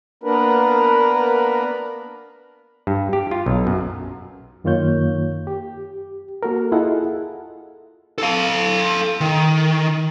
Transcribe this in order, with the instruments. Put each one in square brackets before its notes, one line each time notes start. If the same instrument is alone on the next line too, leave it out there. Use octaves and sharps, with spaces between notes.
[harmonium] A#3 B3 D4 A#4 B4
[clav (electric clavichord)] G2
G4
F4
B1
F#2
[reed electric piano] F#2 D#3 A#3 F4 C#5 G6
G4
A#3 F#4 A4 A#4
E4 F4 G#4 A4 D#5 F#5
[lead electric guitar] A4 F5
D#3